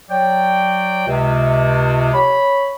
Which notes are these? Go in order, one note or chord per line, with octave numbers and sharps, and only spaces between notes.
F#3 D5 G5
C#2 C3
C#5 B5